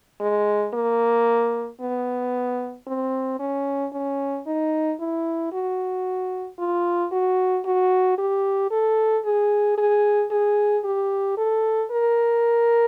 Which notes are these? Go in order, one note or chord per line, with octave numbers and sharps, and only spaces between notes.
G#3
A#3
B3
C4
C#4
C#4
D#4
E4
F#4
F4
F#4
F#4
G4
A4
G#4
G#4
G#4
G4
A4
A#4